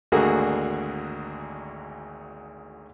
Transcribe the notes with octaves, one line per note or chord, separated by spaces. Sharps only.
G#1 D2 D3 A#3 F#4 G#4